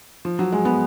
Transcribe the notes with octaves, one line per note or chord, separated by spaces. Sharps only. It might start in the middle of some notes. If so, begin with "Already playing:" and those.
F3
F#3
G#3
B3